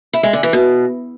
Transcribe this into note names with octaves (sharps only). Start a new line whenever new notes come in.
E4
G#3
D3
E3
B2